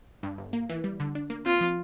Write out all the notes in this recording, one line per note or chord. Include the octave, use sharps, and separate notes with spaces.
G2
G1
A#3
E3
G3
D3
D4
A#3
C4 F4
F3